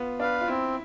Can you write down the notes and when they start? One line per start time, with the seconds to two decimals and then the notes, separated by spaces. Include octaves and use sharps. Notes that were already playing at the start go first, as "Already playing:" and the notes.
Already playing: B3 F4
0.20 D4 B4 F5
0.41 F4
0.48 C4 E4